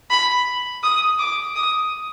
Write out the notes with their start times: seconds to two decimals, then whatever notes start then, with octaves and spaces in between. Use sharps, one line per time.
0.10 B5
0.83 D#6
1.19 D6
1.55 D#6